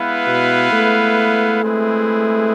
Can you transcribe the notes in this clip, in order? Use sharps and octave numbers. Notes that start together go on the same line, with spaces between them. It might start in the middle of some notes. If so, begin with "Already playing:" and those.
Already playing: G#3 B3 E4 B4 F5
B2
A3
G#3 C4 E4 G#4 B4